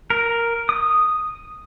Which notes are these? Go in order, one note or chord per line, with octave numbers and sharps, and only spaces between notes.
A#4
D#6